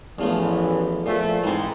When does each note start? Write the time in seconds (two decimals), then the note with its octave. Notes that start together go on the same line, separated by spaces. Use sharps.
0.19 A1 E2 E3 F3 A3
1.06 A#2 F3 A3
1.43 G#2 E3 C4